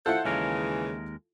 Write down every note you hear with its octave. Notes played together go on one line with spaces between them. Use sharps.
E4 F4 A4 C5 F#5
D#2 C#3 E3 G#3 A#4